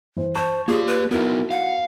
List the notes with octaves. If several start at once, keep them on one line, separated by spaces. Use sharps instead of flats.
E3 C5
C5 A5 C#6
A#3 F4 G4 G#4 D5
B4
B3 D#4 E4 F#4 A#4
F5 F#5